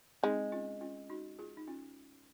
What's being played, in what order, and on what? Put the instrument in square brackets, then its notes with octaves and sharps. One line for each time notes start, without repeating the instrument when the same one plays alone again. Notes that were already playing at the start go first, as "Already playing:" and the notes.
[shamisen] G#3 [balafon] C4 D#4
[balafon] C#4 F4
C#4 F4
D#4 F#4
F4 G#4
D#4
C#4 F4